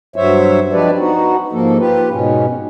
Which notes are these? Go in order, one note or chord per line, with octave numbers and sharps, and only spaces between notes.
G2 F#3 C5 C#5 E5
F3 G#3 D4 G4 B4 D5
B3 D#4 F#4
G#2 F3 A#3 A4
F4 G4 B4
G#2 B2 C#4